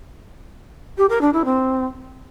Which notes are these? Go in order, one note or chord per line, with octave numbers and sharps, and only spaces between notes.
G4
A#4
D4
E4
C4